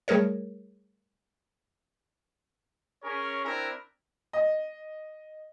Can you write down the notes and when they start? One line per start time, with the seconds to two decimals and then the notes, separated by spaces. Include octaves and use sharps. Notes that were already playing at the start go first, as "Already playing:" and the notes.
0.08 G3 A3 G#4 A#4 C#5
3.04 C#4 G#4 A#4 C#5
3.44 C4 D4 E4 A#4
4.33 D#5